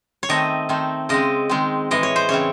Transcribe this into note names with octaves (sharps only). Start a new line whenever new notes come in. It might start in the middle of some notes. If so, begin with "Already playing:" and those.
C#5
D#3 A3 C4 D#5
D#3 A3 C4
C#3 G#3 C4 D#5
D#3 G#3 C4
A2 E3 G#3 D#5
C#5
C5
C#3 E3 C4 C#5